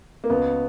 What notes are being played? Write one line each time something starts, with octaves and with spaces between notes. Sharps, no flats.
A#3
C#2 B3